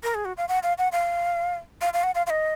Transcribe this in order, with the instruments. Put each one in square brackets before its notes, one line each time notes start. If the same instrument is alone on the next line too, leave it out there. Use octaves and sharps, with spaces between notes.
[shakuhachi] A#4
G#4
F#4
F5
F#5
F5
F#5
F5
F5
F5
F#5
F5
F5
D#5